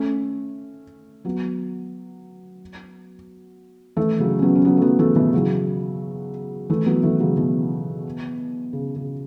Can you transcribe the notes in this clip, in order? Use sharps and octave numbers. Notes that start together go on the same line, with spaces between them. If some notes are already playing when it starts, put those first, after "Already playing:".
Already playing: A3 C#4
F#3 B3
E3 A3
C#3 F#3
C#4
F#3 B3
C#4
F#3 B3
A3
F#3 B3
E3 A3
B2 E3
C#3 F#3
E3 A3
F#3 B3
E3 A3
C#3 F#3
B2 E3
C#3
C#3